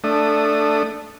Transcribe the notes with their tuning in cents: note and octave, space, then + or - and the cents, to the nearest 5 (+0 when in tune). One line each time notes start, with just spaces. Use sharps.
A3 +5 D4 +0 D#6 -20